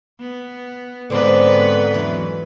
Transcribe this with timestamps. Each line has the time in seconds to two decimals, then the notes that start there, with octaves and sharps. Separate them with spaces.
0.20 B3
1.10 G#2 D3 B3 C4 B4
1.94 E2 E3 F#3